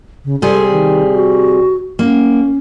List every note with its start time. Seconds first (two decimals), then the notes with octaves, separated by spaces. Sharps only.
0.25 C#3
0.42 C3 G3 G#4 A4
0.71 D#3
1.13 F#4
1.99 A#3 C#4